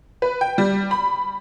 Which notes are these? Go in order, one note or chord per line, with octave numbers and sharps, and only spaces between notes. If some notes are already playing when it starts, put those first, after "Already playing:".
B4
G5
G3
B5